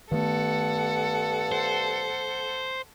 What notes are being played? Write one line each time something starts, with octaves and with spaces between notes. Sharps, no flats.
G2 D#3 A3 B3 A4 F#5
C5